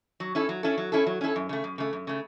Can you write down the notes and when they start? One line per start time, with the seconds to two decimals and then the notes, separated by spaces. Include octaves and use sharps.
0.20 F#3
0.35 C#4 E4 A4
0.49 F#3
0.63 C#4 E4 A4
0.78 F#3
0.92 C#4 E4 A4
1.06 F#3
1.21 C#4 E4 A4
1.36 F#2
1.49 C#3 A3
1.64 F#2
1.78 C#3 A3
1.93 F#2
2.07 C#3 A3